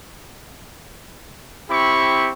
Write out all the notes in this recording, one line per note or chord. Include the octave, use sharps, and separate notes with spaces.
C4 E4 G4 B5 C#6